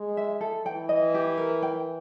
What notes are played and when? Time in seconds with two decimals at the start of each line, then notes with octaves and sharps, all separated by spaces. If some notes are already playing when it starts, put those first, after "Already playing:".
Already playing: G#3
0.17 E5
0.41 A4
0.66 E3 G5
0.89 D#5
1.14 G4
1.38 A#4
1.62 G5